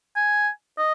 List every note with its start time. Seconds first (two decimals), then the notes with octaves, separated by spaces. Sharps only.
0.16 G#5
0.78 D#5